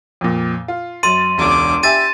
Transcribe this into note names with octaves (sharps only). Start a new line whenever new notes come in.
F2 A#2
F4
F#2 C6 A6 D#7
E1 C#2 D4 D6
G4 E5 G#5 A5 A6 D#7